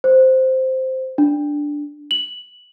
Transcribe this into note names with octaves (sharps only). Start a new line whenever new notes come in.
C5
D4
F#7